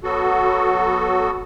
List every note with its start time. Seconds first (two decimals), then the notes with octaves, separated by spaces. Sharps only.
0.03 F#3 B3 F#4 A4